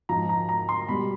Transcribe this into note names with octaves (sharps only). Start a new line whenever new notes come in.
G#2 F3 A#5
A#5
A#5
C6
B2 G3 B5